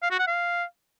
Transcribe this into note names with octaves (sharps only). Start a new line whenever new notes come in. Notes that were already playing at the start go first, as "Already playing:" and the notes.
F5
F#4
F#5
F5